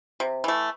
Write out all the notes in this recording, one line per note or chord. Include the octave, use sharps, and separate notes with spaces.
C3
E3 A3